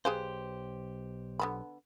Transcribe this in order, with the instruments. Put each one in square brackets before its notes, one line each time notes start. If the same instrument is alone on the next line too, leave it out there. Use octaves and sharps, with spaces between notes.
[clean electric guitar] B1 G4 C5 [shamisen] G#4 B4 F5
[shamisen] D3 B3 B5